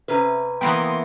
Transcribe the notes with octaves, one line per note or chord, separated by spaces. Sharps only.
C3 C#4 B4
E3 A#3 B3 G5 B5 C6 D#6